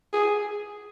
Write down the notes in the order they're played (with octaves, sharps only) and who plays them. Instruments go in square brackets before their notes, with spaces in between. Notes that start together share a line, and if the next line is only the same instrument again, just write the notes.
[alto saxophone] G#4